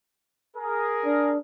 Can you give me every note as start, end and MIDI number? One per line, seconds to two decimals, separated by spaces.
0.56 1.34 68
0.56 1.34 70
1.05 1.38 62